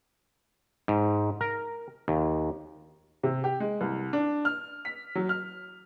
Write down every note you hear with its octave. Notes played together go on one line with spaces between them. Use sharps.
G#2
A#4
D#2
C3
G4
G#3
C2
D4
F6
B6
F#3
F6